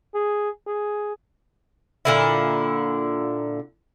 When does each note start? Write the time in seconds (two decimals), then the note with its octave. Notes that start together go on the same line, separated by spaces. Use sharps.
0.14 G#4
0.67 G#4
2.05 A#2 D3 E4